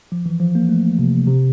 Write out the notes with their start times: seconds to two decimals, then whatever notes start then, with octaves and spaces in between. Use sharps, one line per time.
0.12 F3
0.26 E3
0.40 F3
0.55 A#3
0.69 A3
0.99 C3
1.27 C3